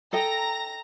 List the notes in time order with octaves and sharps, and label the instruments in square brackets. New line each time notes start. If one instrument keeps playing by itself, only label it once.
[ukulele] A4 D#5 G5 [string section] A#5 A#6